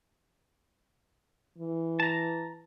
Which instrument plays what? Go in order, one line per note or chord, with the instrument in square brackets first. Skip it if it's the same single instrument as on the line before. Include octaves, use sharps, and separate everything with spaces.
[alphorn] E3
[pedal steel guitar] A5 A#5